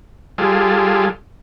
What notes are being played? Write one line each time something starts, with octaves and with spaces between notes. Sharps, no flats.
G3 F4 G#4 A4